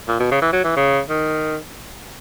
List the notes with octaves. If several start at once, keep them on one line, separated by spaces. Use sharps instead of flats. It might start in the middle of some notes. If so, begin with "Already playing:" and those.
A#2
B2
C#3
E3
F#3
E3
C#3
D#3